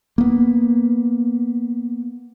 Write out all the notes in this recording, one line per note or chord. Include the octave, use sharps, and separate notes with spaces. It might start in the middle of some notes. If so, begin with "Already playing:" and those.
A#3 B3